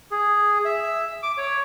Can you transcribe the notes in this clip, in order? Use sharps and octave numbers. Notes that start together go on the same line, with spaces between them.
G#4
E5
D6
C#5